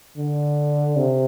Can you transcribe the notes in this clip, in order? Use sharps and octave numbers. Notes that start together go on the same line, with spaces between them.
D3
C3